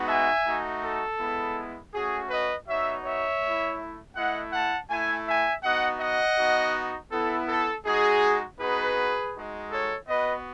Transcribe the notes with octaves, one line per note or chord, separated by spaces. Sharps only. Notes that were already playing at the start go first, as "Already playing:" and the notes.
Already playing: G#3 B3 D#4 F#4
E5 G#5
A3 D#4 F#4
A4
G#3 B3 E4
A3 C#4 F#4 G#4
B4 D#5
B3 D#4 F#4 C#5 E5
C#5 E5
A3 E4
A3 E4 D#5 F#5
F#5 A5
A3 E4 E5 G#5
E5 G#5
B3 D#4 F#4 D#5 F#5
D#5 F#5
B3 D#4 F#4
B3 E4 A4
A4
G#3 D#4 F#4 G#4
B3 D#4 F#4 G#4 B4
G#3 D#4 F#4
A4 C#5
B3 F#4 B4 D#5